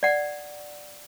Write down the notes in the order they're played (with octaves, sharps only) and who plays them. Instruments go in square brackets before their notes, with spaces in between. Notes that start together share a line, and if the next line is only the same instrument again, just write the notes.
[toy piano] D5 F#5